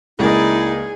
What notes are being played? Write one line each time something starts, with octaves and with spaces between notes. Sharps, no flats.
C#2 A#3 D#4 E4 G#4 D5